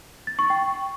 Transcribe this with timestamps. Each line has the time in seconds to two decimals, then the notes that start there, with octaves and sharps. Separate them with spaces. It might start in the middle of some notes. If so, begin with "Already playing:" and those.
0.27 A6
0.39 C#6
0.50 G5